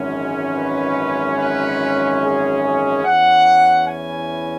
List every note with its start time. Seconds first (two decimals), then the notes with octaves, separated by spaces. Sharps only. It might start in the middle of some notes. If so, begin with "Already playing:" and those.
Already playing: G#1 F#2 E3 G#3 C#4
0.56 B4
1.38 B4
2.22 G#4
2.64 G#4
3.05 E2 E3 C#4 E4 F#5
3.88 G#5